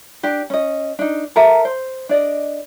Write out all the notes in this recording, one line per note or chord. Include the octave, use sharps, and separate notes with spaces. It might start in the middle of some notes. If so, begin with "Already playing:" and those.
D4 G4
C#4 D#5
D4 D#4
A4 A#4 E5 A#5
C5
D4 D5 D#5